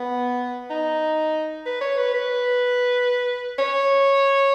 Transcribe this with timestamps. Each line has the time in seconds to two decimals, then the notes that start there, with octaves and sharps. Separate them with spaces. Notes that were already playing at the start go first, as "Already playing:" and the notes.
Already playing: B3
0.70 D#4
1.66 B4
1.81 C#5
1.98 B4
2.14 B4
3.59 C#5